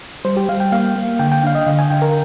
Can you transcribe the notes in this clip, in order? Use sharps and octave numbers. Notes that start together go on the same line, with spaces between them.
G3 C5
G4
G3 F5
G5
A#3 F5
A#3
D3 G5
G5
D4 F5
D#5
D3 F5
G#5
D3 G5
A#4